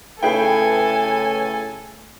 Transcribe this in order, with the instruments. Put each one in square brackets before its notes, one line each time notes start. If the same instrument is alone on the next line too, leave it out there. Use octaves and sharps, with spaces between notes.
[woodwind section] A2 C#3 A3 [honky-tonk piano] G#4 B4 G5 [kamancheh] A4 G#5